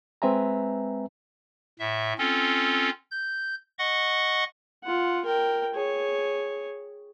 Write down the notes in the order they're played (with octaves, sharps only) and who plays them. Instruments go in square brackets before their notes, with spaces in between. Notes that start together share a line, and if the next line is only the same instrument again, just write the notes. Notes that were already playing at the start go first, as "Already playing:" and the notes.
[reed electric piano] G#3 C4 B4 E5 G#5 A#5
[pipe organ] A2 E5
C4 C#4 F4 A4
G6
D#5 F#5 C#6
[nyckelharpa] F4 F#5
A#4 G5
G#4 C#5